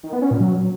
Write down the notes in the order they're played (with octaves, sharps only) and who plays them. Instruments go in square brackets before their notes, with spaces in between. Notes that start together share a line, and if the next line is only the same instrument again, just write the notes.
[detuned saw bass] D#3
B3
C#4
A#2
F#3